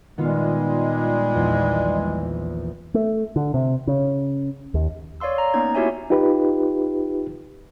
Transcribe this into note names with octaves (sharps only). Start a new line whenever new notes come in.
A#2 D#3 G3 G#3 B3 F4
A#1 E2
A3
D3
C3
C#3
D#2
C#5 D5 F5 C6 E6
A#5
A#3 B3 C#4 D#4 G#6
E4 F#4 G4 C#5 E5 G#5
D#4 F4 G4 B4